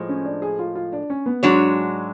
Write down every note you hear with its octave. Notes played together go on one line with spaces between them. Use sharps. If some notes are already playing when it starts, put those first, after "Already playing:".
Already playing: A2 F3 G#3
C#4
D4
G#4
F4
F4
D4
C#4
B3
G#2 F#3 G#3 D4 F#4 C#5